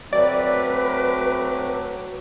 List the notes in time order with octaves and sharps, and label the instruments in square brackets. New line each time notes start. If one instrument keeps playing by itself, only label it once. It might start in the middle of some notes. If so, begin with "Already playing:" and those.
[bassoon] F#3 [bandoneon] A3 C4 D6 [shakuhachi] B4 [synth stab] D5